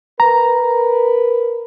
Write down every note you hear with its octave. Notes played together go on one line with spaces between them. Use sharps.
A#4 B4 A#5